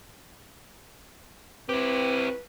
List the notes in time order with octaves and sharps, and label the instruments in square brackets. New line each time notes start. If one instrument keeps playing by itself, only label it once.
[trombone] C4 [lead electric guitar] E4 G4 [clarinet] B4